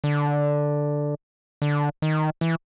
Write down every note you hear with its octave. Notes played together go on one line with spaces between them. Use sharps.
D3
D3
D#3
E3